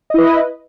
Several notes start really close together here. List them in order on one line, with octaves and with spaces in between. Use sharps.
D#5 E4 B4